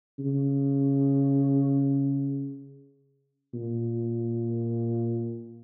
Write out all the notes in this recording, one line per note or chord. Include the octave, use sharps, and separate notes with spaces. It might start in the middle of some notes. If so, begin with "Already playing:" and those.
C#3
A#2